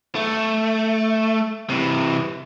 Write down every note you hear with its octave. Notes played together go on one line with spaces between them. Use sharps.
A3
C3 E3